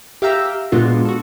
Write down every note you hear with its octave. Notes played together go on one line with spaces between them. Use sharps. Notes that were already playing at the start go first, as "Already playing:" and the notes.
G4 E5 F5 G5 A#5 E6
A#2 G#3 B3 D4 F4 F#4
F#4 A4